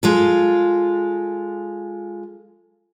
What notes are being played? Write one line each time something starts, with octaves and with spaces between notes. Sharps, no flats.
G#3 F4 A4